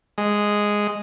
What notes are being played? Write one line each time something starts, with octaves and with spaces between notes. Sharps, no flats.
G#3